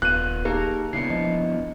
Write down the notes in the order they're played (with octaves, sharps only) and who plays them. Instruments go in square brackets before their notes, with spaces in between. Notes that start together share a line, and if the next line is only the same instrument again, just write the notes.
[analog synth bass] D#1 [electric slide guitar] B3 F4 [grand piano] F#6 D#7
[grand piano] A#3 [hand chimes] D#4 G4 G#4 [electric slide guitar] A#4
[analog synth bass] C#3 [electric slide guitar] B3 D4 E4 [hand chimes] C7 C#7
[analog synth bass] F3 [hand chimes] D#5